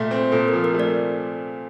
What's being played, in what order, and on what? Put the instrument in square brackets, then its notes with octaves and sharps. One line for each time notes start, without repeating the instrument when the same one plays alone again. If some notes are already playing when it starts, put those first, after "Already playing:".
Already playing: [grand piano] A#2 A3 [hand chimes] E5
[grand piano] C4
[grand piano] A#2 [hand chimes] A4
[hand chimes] A#4
[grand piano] F3
[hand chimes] A#4
[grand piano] A3
[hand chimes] D5